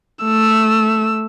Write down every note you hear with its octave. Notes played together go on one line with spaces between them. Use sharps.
A3 E6